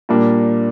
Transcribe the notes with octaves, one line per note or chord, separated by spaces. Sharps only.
A#2 G3 A#3 D4